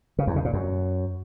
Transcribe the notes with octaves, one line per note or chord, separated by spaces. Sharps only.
C#3
E2
C#3
A#2
F#2